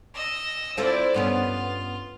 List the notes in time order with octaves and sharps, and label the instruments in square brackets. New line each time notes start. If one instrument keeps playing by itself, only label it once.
[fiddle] D#5 E6
[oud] C4 F4 A4 [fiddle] E4 D5
[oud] G2 B3 C#4 [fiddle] F4